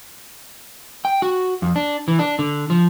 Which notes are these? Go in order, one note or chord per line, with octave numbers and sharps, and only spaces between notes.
G5
F#4
F2
D4
E3
D4
D3
F3